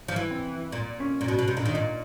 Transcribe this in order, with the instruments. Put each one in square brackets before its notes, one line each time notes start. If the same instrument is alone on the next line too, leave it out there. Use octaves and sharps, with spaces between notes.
[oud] F3
E3
[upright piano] C4
[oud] A#2
[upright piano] C#4
[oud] A#2
B2
B2
C3
[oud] A#2 [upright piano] D4
[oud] D#3
[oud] A#2 [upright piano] D#4